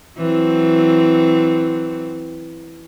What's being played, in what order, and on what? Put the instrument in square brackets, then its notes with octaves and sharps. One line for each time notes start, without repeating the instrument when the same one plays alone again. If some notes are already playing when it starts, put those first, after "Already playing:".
[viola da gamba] E3 F#3 C4